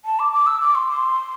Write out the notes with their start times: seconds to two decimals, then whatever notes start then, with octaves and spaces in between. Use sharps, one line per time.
0.05 A5
0.19 D6
0.33 D6
0.46 E6
0.61 D6
0.75 C6
0.89 C6